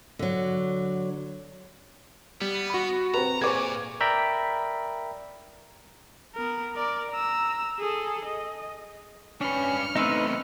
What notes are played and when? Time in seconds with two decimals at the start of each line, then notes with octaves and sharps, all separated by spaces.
0.19 D3 F#3
2.41 G3 B3
2.70 F#4 B5
3.14 C4 B4 A#5
3.42 A#2 G#4 B4 C5 C#6 D6 G#6
4.00 A#4 D5 E5 G5 A#5 B5
6.35 B3 A#4
6.75 A#4 D5
7.11 A#5 E6
7.80 G#4 A4
8.25 D#5
9.41 C#4 D4 B4 F6 C#7
9.96 A3 B3 C4 D#4 B4 E5